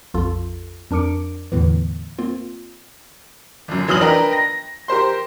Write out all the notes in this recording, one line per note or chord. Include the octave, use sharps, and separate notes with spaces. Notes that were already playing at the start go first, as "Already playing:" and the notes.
A#1 F2 F4 A4
F2 D4 A#4 D6 C#7 D7
E2 A2 D3 E3
A#3 C4 F4
G1 F#2
F1 E3 F#3 D#6 F6 F#7
D4 A#4 B4 D#5 G5 A#5
A#6
G4 A#4 C5 C6